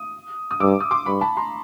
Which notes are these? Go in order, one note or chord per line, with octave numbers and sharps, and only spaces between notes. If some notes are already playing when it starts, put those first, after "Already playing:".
Already playing: D#6
D#6
G2 D6 E6
D#6
C6 D6
G2 B5 C#6
A5 B5
A#5 C6